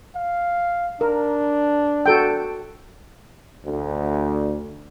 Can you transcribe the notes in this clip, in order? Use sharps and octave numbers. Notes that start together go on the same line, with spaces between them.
F5
D4 A#4
F#4 A4 G5
D2